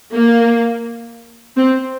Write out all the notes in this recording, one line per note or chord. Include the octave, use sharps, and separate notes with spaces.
A#3
C4